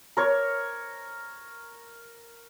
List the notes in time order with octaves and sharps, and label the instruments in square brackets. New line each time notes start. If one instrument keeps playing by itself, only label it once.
[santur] A#4 C#5